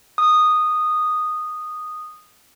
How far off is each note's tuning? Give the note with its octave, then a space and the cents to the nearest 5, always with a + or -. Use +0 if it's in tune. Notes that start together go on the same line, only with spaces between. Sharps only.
D#6 -10